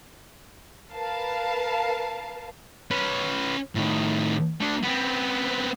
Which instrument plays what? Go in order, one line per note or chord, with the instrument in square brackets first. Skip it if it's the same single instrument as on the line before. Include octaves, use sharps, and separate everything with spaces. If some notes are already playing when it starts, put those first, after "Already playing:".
[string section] A#4 B4 F5 A5
[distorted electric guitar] C#4 B4
A2 D#3
A3 D4
B3 C4